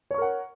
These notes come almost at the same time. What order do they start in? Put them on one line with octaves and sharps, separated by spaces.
C#5 C#6 A#4 F#5